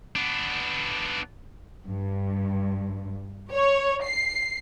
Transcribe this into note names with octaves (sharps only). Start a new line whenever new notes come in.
B3 D4
G2
C#5
C7